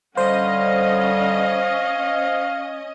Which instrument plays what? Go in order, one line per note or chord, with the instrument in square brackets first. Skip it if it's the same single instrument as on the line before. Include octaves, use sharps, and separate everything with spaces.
[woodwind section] D3 G3 [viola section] C#4 D#5 [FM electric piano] C5 [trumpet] F5